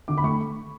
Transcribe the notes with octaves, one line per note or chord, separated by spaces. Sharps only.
D3 D6
B5
A3 C#6